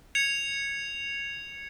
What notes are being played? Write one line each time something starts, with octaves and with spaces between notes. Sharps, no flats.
G#6 C#7 F7